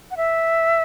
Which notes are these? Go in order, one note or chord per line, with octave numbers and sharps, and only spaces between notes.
F#5
E5